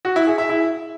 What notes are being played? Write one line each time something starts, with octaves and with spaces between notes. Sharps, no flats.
F#4
E4
G#4
E5
E4